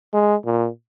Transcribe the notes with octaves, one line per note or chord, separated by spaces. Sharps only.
G#3
A#2